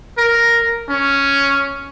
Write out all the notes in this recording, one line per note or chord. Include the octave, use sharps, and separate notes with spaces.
A#4
C#4